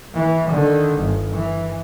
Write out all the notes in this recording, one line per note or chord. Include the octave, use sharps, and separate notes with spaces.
E3
D3 D#3
G1
E3